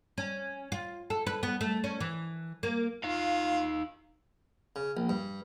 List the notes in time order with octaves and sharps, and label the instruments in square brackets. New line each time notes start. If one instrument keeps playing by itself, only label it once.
[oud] C#4
F4
A4
B4
B3
A3
C#4
E3
A#3
[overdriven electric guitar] D#4 F5 [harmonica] F4
[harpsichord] C#3
A#1
G2